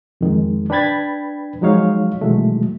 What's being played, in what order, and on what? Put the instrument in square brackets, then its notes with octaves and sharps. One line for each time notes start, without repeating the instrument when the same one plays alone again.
[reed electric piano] F2 D#3 G#3
D4 B4 G5 B5 G#6 A6
F3 F#3 G#3 D#4 C#5 F5
B2 D#3 E3 F#3 G#3 A3